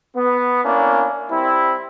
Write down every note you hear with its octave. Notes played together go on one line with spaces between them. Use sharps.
B3
A#3 C#4 D4 E4
G3 C4 E4